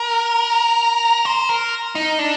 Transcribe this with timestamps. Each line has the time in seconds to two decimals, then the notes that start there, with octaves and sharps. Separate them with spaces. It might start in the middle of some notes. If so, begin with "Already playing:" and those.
Already playing: A#4
1.25 C5
1.49 A#4
1.95 D#4
2.19 D4